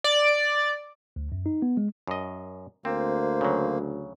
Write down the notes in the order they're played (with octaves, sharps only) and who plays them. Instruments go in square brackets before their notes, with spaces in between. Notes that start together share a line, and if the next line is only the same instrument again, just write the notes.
[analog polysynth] D5
[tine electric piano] D2
F#2
D#4
B3
G#3
[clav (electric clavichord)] F#2 D#5
[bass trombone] D2 [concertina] A#3 [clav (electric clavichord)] C4 [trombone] C5
[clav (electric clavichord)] C#3 F#3